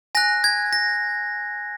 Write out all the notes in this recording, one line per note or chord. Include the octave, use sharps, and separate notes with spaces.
G#5 F#6 A#6
G#6
A#6